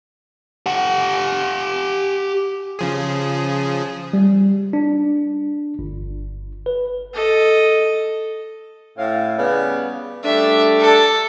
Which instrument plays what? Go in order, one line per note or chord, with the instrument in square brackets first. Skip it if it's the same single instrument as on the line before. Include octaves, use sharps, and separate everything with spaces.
[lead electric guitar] G4 F#5
[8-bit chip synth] C#3 F3 G#4
[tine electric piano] G3
D4
G1
B4
[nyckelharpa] A4 D#5
[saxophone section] A2 C#4 F5
C#3 G3 B3
[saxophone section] G3 A3 D4 [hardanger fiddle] E5
[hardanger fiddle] A4